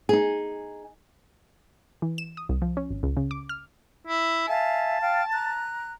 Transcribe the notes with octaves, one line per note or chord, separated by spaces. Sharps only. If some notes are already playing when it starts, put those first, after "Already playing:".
D#4 G#4
E3
E7
D#6
C2
F3
C#4
G#1
C#2
C#3
D6
F6
E4
E5 F5 G#5 A5
F5 G5 F6
A#5 F#6